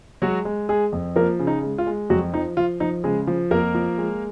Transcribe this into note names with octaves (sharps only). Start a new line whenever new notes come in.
F#3 G#3 F#4
G#3
G#3 G#4
F2
F3 A#3 A#4
C#3
D#4
G#3
F4
G#3
F2 F#3 F#4
F3 D#4
F3 F4
F3 D#4
C#3 G#3 G#4
F3
F2 A#3 A#4
F3
G#3